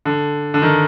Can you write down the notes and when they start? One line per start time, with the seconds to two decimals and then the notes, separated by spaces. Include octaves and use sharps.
0.05 D3
0.54 D3
0.62 D#3